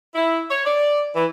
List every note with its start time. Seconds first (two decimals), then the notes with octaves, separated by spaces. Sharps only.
0.15 E4
0.50 C#5
0.65 D5
1.15 E3